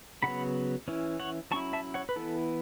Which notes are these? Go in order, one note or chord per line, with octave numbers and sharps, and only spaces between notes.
C#3 F#3 B3 F#5 B5
E3 C#4 E4
C#5 F#5
F#3 C#4 E4 A5 C#6
E5 A5
C#5 F#5
B4
E3 B3 E4 A4